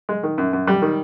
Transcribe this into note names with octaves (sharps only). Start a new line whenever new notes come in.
G#3
D#3
F#2
F#2
G3
D#3